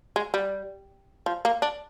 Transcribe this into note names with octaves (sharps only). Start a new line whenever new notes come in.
G#3
G3
F3
A#3
D4